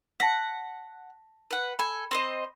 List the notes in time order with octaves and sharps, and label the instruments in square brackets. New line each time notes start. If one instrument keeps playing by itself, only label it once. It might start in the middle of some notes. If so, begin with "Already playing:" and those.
[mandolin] F#5 [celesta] A5 A#6 B6
[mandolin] B4 F#5
[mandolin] A4 G#5 [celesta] B5
[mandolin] C4 C5 D#5